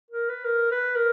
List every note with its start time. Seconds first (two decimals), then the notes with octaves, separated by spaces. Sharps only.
0.11 A#4
0.29 B4
0.44 A#4
0.71 B4
0.96 A#4